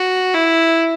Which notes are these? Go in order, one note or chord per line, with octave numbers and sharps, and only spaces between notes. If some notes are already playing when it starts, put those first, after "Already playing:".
Already playing: F#4
E4